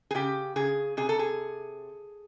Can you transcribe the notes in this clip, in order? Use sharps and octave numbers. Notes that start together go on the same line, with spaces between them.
G#4
C#3 G4
C#3 G#4
C3 G#4
A4
G#4